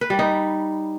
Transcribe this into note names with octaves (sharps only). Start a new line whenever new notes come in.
B4
G3
D#4